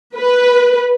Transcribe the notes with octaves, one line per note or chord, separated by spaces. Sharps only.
B4